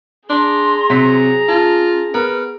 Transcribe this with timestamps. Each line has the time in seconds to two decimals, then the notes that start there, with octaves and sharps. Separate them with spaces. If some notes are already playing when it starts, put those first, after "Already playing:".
0.29 D4 G#4 A#5 C6
0.90 C3 F#3 B6
1.48 C#4 F4 A5
2.14 B3 A#4 F6